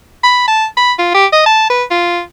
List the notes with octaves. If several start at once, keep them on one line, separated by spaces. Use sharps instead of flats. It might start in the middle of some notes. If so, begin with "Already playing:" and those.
B5
A5
B5
F4
G4
D#5
A5
B4
F4